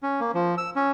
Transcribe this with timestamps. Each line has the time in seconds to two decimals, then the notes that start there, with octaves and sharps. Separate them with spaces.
0.03 C#4
0.20 A#3
0.34 F3
0.58 E6
0.76 C#4